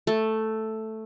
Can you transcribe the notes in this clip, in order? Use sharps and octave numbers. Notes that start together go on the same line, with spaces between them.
A3